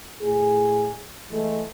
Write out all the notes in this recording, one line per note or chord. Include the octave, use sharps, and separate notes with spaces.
A2 G#4
E3 G#3 A3